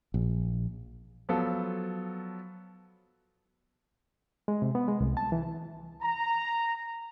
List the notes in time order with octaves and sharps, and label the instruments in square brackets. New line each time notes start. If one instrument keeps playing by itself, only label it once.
[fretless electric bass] A#1
[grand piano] F3 F#3 B3 F4 A4
[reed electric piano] G#3
C3
B3
G#3
C2
A5
E3
[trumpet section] A#5